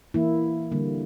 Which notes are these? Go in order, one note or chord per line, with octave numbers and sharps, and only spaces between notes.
E3 A#3 E4
D3 G3 A#3